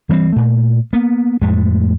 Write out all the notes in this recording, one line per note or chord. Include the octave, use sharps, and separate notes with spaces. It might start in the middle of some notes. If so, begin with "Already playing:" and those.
E3 G3 B3 C4
A#2 A3
A#3 B3
F2 A2 G#3 A3